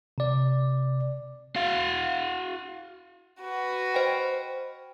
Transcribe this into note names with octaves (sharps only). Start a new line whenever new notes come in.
C3 D5
F#4 F5
F#4 B4
C5 D#5 G5